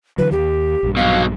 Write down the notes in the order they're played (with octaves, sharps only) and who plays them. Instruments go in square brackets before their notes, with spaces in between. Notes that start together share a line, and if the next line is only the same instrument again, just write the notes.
[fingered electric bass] D3 E3 F#3 [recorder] B4
[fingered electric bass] D#2 [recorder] G4
[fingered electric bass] A#1 G2
[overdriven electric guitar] B2 F#3 [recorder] F5